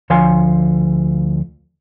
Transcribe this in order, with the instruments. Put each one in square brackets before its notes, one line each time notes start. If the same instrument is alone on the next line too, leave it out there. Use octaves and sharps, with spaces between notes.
[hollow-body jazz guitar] D2 F3 C#5 F5 G#5 C6